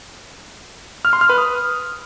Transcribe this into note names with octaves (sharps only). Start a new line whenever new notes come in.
F6
C6
F6
B4
D#6